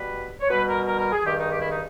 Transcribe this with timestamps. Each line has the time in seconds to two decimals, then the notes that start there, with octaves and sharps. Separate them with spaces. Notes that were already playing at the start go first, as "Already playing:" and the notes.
Already playing: B2 G3 B4
0.40 C#5
0.48 B2 G3 B4
0.68 A#4
0.86 A#4
0.99 A#4
1.11 G#4
1.24 G2 D#3 G#3 G4
1.37 D#4
1.49 G4
1.60 E4
1.70 D#4